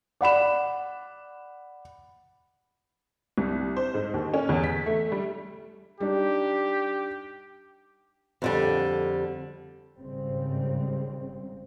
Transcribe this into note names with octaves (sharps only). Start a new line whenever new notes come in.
D5 F#5 B5 E7
C2
C5
G#2
D#2
C#4
E2
B6
A3
G3
G3 D4 D#4 G4
F2 D3 G3
G#1 G#2 C#3 G3 C4